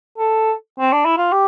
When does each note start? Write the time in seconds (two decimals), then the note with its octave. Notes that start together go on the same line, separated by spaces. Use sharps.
0.18 A4
0.79 C4
0.92 D4
1.05 E4
1.18 F4
1.32 G4